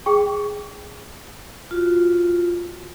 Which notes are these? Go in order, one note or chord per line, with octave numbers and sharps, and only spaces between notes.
G#4 G5 C#6
F4 F#4